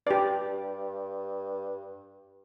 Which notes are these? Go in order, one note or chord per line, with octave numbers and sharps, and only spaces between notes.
G2 G4 D5